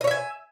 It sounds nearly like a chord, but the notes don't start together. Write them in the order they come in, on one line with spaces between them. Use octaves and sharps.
D#5 C#5 E5 G#5